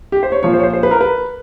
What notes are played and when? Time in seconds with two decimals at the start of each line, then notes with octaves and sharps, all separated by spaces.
0.12 G4
0.23 C5
0.32 C#5
0.43 A#2 F3 C#5
0.53 C5
0.59 C#5
0.63 C5
0.74 C5
0.83 B4
0.91 A#4
1.01 B4